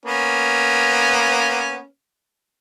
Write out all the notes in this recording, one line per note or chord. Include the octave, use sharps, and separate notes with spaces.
A#3 B3 C#4